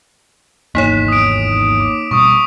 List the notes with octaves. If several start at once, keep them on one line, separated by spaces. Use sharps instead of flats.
G#1 E2 A#3 D#4 C#5 B6 C7 E7
D#6 D7
D6
B2 G3 C#6 D#6